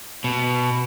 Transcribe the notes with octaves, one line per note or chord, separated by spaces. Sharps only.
B2